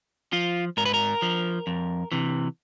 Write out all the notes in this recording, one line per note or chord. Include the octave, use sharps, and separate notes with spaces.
F3 F4
G#2 A#4
B4
A#4
F3
F2
C3 E3